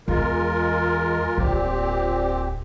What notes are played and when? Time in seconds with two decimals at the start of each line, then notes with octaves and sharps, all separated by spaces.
0.08 E2 G#3 F4 A#4
1.38 D1 A#2 C4 G4